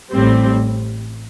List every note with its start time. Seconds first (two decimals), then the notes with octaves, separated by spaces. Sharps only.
0.11 A1 A2 G3 C4